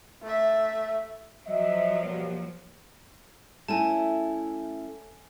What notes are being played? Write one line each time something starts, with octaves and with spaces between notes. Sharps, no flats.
A3 E5
F3 F#3 D#5 E5
B2 G3 A#3
A3 C#4 E4 G#5 A5